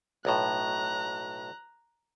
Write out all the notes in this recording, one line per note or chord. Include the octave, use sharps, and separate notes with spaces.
B1 A2 A#5 F#6